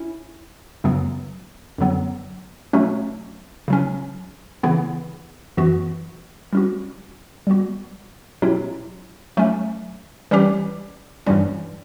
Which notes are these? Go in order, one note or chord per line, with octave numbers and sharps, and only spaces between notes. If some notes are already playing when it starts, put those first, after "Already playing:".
Already playing: C#4 E4
F#2 C#3 F#3 B3
F#2 D3 F#3 B3
B2 F#3 A3 C#4
C#3 F#3 C#4
C#3 E3 B3 E4
F#2 E3 B3 F#4
G3 C#4 F#4
G3 B3 F#4
B2 F#3 C#4 E4 G4
F#3 A3 C#4
E3 G3 C#4 G4
G2 E3 G3 C#4